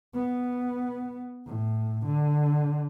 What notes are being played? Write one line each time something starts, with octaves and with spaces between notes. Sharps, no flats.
B3
A2
D3